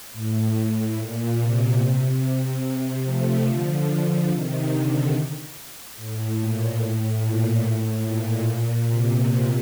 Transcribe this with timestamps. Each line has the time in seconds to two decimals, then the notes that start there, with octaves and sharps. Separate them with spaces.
0.13 A2
0.97 A#2
1.38 C3
1.80 C3
3.04 F3 A3
3.46 D3 F3
4.30 C3 D#3
4.71 D3
5.97 A2
6.38 A#2
6.80 A2
7.21 A#2
7.63 A2
8.05 A#2
8.88 C3